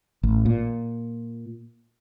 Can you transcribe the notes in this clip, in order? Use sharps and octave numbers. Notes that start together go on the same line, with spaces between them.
A1
A#2